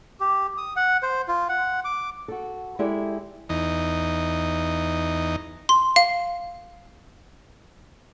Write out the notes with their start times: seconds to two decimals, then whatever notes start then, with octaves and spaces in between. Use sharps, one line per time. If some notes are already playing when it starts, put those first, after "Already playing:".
0.20 G4
0.58 D#6
0.76 F#5
1.03 C5
1.28 F4
1.49 F#5
1.85 D6
2.28 F#4 A4
2.79 G#3 E4 G4 A4 D5
3.49 E2 D#4
5.69 C6
5.96 F5